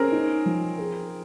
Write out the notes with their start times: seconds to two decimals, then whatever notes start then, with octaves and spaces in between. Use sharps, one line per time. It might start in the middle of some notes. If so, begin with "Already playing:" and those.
Already playing: C4 C#4 G#4 A#4
0.12 D#4
0.46 F3
0.78 G#4